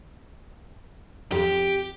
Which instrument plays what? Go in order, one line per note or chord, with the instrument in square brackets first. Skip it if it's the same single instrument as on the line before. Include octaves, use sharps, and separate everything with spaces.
[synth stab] F2 [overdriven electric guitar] G4